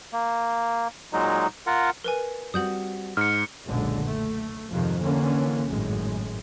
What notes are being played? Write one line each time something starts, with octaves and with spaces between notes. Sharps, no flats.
A#3
A#2 F#3 G#3 D#4
F4 A#4 F#5
A#4 B4 G#5
G3 C4 F#4 D#6 G6 F#7
G#2 F6 C#7
F#1 B1 A#2 D3 G#3
A3
F2 G#2 C3 D#3 F3
D3 E3 A#3 C#4
G#1 F#2 A2 G#3